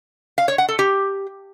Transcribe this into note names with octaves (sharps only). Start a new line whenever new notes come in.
F5
C#5
F#5
A4
G4